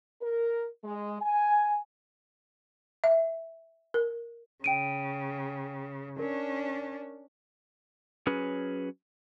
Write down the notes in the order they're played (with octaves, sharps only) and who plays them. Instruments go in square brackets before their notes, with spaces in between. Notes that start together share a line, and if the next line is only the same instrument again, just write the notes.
[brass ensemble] A#4
G#3
G#5
[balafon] E5
A#4
[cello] C#3 [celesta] G5 D7 D#7
[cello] C#4 D4 [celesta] A#4
[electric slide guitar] F#3 C#4 G#4 B4